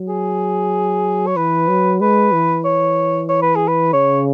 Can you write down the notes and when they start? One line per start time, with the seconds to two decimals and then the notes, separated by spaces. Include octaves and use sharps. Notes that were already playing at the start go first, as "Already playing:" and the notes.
Already playing: F#3
0.08 G#4
1.27 C#5
1.36 E3 B4
1.68 F#3
2.01 G#3 B4
2.33 E3
2.65 C#5
3.29 C#5
3.42 B4
3.56 G#4
3.68 B4
3.93 C#3 C#5